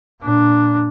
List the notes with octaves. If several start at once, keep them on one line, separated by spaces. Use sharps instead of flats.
A#2 D4